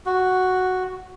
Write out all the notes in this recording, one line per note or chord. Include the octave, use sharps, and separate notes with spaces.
F#4